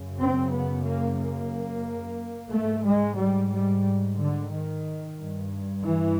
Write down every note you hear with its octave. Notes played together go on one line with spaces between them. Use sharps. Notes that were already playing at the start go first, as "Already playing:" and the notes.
Already playing: F#2 C#3
C4
B3
A#3
A#3
G#2 A3
G#3
G3
G3
D3
D#3
G2
E3